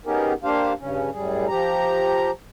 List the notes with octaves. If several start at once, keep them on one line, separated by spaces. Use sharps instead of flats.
B3 C#4 D#4 G4 G#4 A#4
A#3 D4 G4 C5 F5
G2 C#3 C#4
F#2 A2 G3 G#4
F3 G4 A#5